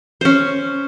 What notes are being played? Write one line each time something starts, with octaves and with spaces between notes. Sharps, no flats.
C#4 C5